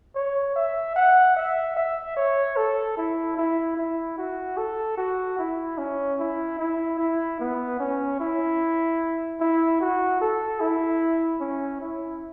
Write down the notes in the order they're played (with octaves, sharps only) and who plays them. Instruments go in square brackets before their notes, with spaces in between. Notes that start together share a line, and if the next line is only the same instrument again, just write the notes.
[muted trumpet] C#5
E5
F#5
E5
E5
C#5
A4
E4
E4
E4
F#4
A4
F#4
E4
C#4
E4
E4
E4
B3
C#4
E4
E4
F#4
A4
E4
C#4
E4